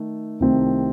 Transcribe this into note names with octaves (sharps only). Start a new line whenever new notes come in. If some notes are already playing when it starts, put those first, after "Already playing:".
Already playing: D#3 A3 D#4
C2 C3 D#3 A3 C4